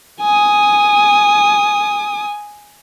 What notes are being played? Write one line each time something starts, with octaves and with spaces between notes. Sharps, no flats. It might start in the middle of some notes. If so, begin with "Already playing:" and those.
G#5 D#6